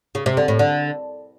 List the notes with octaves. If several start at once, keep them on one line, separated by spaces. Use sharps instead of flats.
C#3
C3
D3
A2
D3